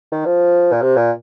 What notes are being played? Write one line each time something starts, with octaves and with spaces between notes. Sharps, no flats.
D#3
F3
A#2
C3
A#2